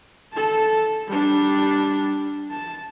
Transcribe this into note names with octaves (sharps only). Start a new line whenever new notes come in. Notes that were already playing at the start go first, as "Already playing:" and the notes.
A4 A5
G3 D4
A5